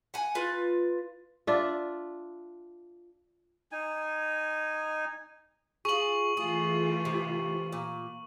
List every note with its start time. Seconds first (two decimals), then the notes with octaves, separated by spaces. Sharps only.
0.14 F#5 G#5
0.35 F4 B4
1.47 D4 F4 E5
3.72 D#4 G#5
5.85 F4 G#4 C#6 F#7
6.37 E3 A3 F4 G#4
7.05 C3
7.72 A#2